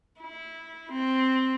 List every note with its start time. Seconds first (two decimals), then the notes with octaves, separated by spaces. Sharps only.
0.20 E4
0.91 C4